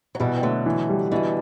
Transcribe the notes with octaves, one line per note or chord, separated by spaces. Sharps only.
F#3
B2 E3 G3
G3
D3 F#3 A3
E3
G3
B2 D3 E3